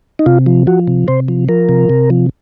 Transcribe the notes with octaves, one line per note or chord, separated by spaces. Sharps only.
D#4
C3 F4
F3
F3 F#4
C3
C3 C5
F3
F3 A#4
C3
C3
F3